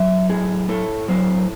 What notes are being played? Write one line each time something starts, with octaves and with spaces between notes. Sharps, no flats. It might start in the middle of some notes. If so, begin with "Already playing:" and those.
Already playing: F#3 E5
A2 G#4
A2 A4
F#3 C5